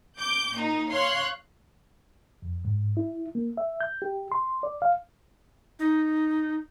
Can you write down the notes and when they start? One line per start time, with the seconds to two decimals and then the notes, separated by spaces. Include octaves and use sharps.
0.19 D6 G6
0.57 A#2 D#4
0.91 C#5 F5 C6 F#6
2.42 F2
2.65 G#2
2.97 E4
3.35 A#3
3.57 E5
3.81 G6
4.02 G4
4.32 C6
4.63 D5
4.82 F5
5.79 D#4